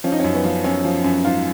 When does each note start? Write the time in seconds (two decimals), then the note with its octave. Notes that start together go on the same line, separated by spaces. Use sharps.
0.04 F3 C#4
0.12 D#4
0.20 F#2 C#4
0.34 B3
0.44 F3
0.64 F#2 C#4
0.84 F3
1.04 F#2
1.24 G#2 F4